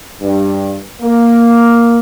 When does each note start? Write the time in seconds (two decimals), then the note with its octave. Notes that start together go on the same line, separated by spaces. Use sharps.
0.21 G2
1.01 A#3